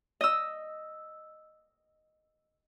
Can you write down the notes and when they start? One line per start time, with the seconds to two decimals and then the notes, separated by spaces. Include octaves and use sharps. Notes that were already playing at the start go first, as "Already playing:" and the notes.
0.21 D#5 E6